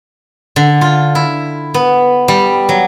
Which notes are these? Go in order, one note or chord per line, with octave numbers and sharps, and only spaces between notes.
D3
F4
E4
B3
G3
F#3